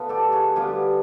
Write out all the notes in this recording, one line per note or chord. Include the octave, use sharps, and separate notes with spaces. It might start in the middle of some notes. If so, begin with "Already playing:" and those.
Already playing: D3 B3 F4
G4 A4
F#4 G#4
D3 G3 B3 F4 G4